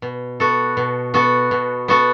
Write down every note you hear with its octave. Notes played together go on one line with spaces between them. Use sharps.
B2
B3 F#4 A4
B2
B3 F#4 A4
B2
B3 F#4 A4